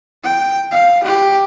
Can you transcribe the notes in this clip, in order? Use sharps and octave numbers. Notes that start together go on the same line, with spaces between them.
G5
F5
G4